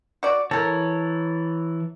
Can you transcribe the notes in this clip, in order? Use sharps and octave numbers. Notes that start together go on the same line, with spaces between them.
F#4 D5
E3 A4 A#4 C#5 A5